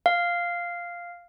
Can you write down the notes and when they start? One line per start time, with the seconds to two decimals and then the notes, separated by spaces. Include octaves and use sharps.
0.06 F5